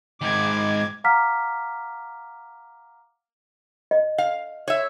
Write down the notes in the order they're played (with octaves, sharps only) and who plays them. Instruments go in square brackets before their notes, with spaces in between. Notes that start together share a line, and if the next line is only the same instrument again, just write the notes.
[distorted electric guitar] G#2 D#3 [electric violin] D6 G#6
[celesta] F5 F#5 A#5 D6 F6 B6
[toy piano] D#5
[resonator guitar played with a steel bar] F5
C#5 E5